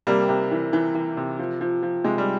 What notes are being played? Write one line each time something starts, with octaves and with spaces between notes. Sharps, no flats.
C3 G3 A#3
C3
E3
E3
E3
C3
F3
F3
F3
C3 G#3
G3